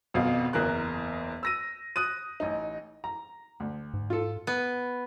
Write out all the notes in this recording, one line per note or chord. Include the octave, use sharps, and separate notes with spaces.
G#1 F2 B2 F5
F#1 E2 A#4 F#6
E6 A#6 D#7
D#6 F#6 D#7
A1 D#4
A#5
D2
G#2
F4 A4
B3